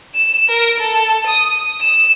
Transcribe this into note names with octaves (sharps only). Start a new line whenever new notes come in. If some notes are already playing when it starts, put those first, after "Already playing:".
E7
A#4
A4
D#6
E7